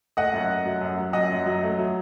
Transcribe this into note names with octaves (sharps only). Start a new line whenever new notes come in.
A3 D#5 F#5
F#2
A3
F#3
F#2
F#3
F#2 D#5 F#5
F#2
F#3
A3
F#3